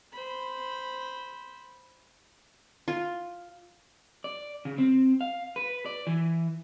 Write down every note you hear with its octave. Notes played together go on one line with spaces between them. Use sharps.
C5 B5
F4
D5
C#3
C4
F5
B4
D5
E3